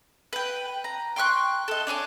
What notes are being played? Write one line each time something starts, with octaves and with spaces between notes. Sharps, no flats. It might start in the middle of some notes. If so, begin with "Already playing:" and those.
B4 G5
A#5
G5 C6 C#6 F#6
A4 D#5
D4 C#5 G#5 D6